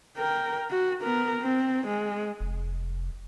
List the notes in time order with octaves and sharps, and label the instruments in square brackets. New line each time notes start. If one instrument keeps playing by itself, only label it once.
[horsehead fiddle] A#4 G5
F#4
B3 A#4
C4
G#3
[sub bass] F1